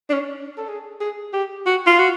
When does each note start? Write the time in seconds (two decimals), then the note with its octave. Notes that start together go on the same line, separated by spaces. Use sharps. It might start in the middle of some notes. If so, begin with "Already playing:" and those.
0.09 D4
0.13 C#4
0.57 A4
0.68 G#4
1.00 G#4
1.33 G4
1.66 F#4
1.87 F4
1.99 F#4